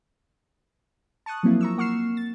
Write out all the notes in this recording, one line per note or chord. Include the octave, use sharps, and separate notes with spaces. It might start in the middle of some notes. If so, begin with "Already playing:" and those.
A5 C#6 D#6 F#6
F3 F#3 A#3 C4 E4 F4
A#5 C#6 E6
A#3 F#5 C#6 F6 C7 E7
A6